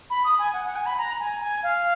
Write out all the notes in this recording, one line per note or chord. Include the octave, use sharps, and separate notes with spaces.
B5
D#6
G#5
F#5
F#5
G#5
B5
A#5
G#5
G#5
F5